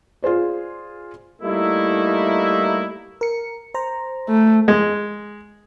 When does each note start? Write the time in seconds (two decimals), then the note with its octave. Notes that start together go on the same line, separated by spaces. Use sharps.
0.23 F4 G#4 C5 D5
1.42 G3 A3 A#3 D#4 E4
3.21 A#4 C#7
3.74 C5 A#5
4.29 A3
4.68 G#3